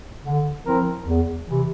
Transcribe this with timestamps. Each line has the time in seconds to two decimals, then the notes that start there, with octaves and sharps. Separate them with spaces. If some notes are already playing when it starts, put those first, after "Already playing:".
0.23 D3
0.64 F3 C4 E4 A#4
1.05 E2
1.47 C3 E3